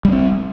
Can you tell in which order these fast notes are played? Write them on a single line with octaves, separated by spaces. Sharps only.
G3 C#4 C4